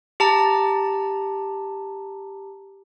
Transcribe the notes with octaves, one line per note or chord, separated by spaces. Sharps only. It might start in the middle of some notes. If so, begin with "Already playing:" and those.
G4 A5 A#5